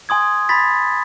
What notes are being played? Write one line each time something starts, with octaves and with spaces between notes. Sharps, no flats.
G#5 C6 D#6 G#6
B5 C6 A6 B6